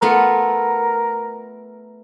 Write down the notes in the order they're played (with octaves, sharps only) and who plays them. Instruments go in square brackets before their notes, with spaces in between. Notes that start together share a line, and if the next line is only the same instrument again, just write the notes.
[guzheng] A3 B3 F4 [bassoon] A#4